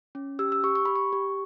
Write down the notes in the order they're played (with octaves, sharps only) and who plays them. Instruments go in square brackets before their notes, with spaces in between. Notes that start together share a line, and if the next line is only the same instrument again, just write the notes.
[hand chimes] C#4
G4 E6
E6
G4 C#6
C#6
G4 B5
C#6
G4